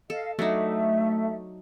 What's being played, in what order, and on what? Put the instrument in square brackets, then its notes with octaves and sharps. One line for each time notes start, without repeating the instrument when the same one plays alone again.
[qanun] A4 [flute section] D#5 F5
[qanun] F#3 D4 D#4 [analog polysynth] A3 [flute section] E5